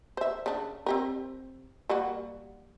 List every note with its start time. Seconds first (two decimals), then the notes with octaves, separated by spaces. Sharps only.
0.17 C5 E5
0.46 C#3 D4
0.86 C4 G4 A#4
1.90 G3 A#3 F#4